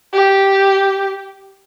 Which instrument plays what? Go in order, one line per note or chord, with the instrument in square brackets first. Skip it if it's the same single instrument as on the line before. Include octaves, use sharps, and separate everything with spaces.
[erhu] G4